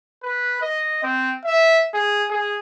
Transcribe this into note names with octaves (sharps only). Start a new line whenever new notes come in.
B4
D#5
C4
E5
G#4
G#4